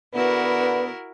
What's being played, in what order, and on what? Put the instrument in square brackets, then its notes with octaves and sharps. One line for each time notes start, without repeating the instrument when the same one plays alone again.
[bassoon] D3 [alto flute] B3 [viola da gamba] E4 F#4 A#4 [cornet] B4